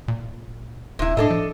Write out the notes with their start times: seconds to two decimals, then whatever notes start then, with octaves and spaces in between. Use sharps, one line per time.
0.08 A#2
0.99 D#1 C3 E4
1.17 A2 D4 A4 D#5
1.30 F3